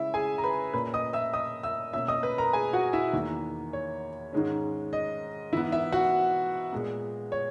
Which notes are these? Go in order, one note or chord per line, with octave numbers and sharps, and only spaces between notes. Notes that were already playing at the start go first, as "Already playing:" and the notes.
Already playing: C#3 G#3 C#4 E4 E5
G#4 G#5
A#5
B4 B5
A#2 A#3 C#4 B4 B5
D#5 D#6
E5 E6
D#5 D#6
E5 E6
B2 A#3 C#4 E5 E6
D#5 D#6
B4 B5
A#4 A#5
G#4 G#5
F#4 F#5
E4 E5
E2 D#3 A#3
C#5
G#2 D#3 G#3 C#4
D#5
G#2 E3 B3 E4 E5
E4 E5
F#4 F#5
A#2 G#3 B3
C#5